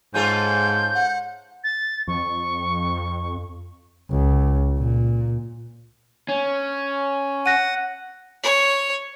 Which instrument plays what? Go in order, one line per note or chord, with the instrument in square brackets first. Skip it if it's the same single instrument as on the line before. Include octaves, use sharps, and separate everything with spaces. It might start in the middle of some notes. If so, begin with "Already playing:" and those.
[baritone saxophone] G#2 [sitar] C#4 F4 A4 [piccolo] G6
[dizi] F#5
[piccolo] A6
[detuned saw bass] F2 [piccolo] C#6
[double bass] C#2
A#2
[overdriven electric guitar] C#4
[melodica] F#5 [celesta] A#6 D#7
[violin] C#5